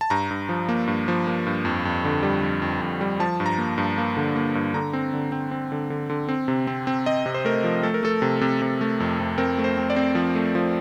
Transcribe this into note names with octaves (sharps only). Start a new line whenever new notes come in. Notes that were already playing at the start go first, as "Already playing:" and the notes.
A5
G2 A#5
G2
F3
A#3
G2
F3
A#3
G2
F2
F2
D3
G3
F2
F2
F2
G3
F3 A5
G2
A#5
A#3
G2
A#3
D3
A#3
G2
D3 A#5
C4
D3
C4
C4
D3
D3
D3
C4
C3
C4
C4
C4 D#5
C3
C5
A3 A#4
F3
A3 A4
A#4
A3 A4
C3
C3
C3
A3
F2
F2
C4 A#4
A3
C5
C4
D5
C4
F3
A3
F3